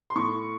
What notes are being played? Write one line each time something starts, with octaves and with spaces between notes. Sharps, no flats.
C6
A2 C#6